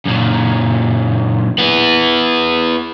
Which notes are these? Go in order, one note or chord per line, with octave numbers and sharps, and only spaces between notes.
F#2 A#2
B3 E4